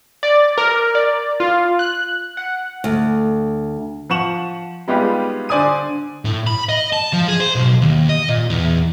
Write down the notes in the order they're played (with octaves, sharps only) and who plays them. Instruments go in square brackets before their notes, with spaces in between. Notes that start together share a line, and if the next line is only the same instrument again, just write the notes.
[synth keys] D5
A#4
D5
F4
F#6
F#5
[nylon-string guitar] D2
[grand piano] F3 F#5 C#6 E7 F#7
G3 G#3 B3 D#4 F4 G4
D3 C5 D5 G#5 D#6 D#7
[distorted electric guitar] A2
B5
D#5
A5
F3
G#4
C5
B1
D#2
D#5
A#2
E2